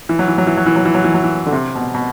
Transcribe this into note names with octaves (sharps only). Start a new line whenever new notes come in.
E3
F#3
E3
F#3
E3
F#3
E3
F#3
E3
F#3
E3
F#3
E3
D3
C3
B2
B2